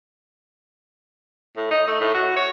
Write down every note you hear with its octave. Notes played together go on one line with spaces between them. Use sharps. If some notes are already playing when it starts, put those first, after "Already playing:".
A2
D#4
A3
A2
F#4
C#5